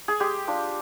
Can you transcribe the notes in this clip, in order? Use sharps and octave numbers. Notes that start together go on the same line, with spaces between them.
G#4
G#3 G4
D4 F4